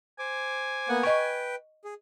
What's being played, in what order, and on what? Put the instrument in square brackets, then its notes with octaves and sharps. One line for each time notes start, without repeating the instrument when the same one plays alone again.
[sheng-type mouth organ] C5 D6 [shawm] G#5
[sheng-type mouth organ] A#3 B3 F#5
[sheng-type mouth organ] B4 G5 [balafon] D#5 C#6
[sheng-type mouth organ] G#4